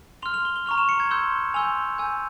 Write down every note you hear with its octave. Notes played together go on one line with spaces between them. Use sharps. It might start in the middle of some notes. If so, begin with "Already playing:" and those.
C6 F6 F7
F7
G7
G7
A#5 C#6 F6 F7
E7
C#7
G#6
C6 E6 G6
G#5 C6 E6 G6 F7
G#5 E6 G6